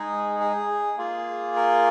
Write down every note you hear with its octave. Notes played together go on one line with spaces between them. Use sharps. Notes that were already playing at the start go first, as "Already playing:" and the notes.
Already playing: G#3 D#4 G#4
G#4
A#3 F4 G#4
A#4